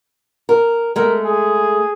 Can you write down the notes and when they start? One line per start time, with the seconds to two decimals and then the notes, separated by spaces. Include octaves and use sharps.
0.49 A#4
0.96 G#3 A3 A#4
1.26 G#4